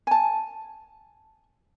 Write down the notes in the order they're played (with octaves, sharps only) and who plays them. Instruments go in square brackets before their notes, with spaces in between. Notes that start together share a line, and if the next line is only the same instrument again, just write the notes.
[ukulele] G#5 A5